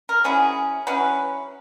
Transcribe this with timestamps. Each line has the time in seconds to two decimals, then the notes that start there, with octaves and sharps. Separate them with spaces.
0.09 A#4
0.24 F#3 C#4 E4 G#4
0.87 F#3 C#4 E4 B4